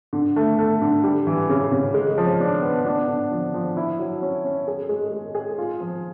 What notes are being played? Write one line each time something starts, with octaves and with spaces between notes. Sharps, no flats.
D3
A3
A3
D3
G3
E3
C#3
C#3
G#3
F3
D4
B3
D4
D3
F3
F3
E4
F#3
C#4
C#4
G#4
G#3
G#3
G#4
F4
F3